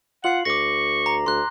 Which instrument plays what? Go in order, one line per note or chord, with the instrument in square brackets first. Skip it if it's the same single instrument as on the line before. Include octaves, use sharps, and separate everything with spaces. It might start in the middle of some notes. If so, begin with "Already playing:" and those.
[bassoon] F4 [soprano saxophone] F#5 [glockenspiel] C7 F#7
[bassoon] D2 [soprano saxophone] C#6 [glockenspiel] D6 A#6
[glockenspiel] A#5
[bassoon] D2 [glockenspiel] C6 F#6